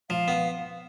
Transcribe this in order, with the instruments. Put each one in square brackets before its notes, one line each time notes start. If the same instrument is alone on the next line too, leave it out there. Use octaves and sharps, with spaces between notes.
[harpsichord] F3 [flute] F5
[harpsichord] B3